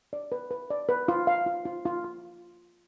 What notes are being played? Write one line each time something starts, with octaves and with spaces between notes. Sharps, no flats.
D5
B4
B4
D5
B4
F4
F5
F4
F4
F4
F4